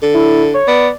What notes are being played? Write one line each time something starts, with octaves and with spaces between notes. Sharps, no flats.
D3
E4
C#5
B3 D5